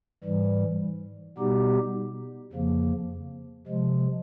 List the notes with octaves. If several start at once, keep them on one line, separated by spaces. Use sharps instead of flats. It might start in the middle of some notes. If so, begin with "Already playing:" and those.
G#2 E3 G3
B2 G3 B3 D#4 G4
F2 C#3 F3 A#3
C3 F3 G#3